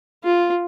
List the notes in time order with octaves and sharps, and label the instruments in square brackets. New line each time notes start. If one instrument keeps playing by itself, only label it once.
[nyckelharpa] F4